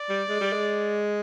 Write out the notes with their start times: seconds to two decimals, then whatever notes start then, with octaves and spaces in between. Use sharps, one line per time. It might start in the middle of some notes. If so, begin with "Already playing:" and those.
Already playing: D5
0.09 G3
0.29 G#3
0.41 G3
0.52 G#3